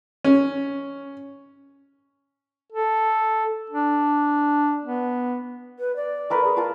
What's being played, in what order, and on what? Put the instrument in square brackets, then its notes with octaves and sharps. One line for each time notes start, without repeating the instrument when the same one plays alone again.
[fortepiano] C#4
[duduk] A4
D4
B3
[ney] B4
D5
[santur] A3 A#4 B4
[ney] G#4
[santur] F4 A5 [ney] A#4